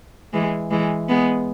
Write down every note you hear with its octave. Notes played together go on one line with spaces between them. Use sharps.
E3 G#3
E3 G#3
G#3 B3